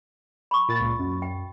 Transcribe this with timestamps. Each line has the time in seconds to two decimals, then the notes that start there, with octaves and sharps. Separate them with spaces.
0.51 B5 C#6
0.68 A#2 A6
0.80 C#2 A#2
0.99 F#2
1.22 G5